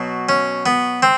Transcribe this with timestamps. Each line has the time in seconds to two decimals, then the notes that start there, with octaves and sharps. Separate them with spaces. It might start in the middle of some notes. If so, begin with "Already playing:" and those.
Already playing: B2 F#3
0.29 C#4
0.66 B3
1.03 C4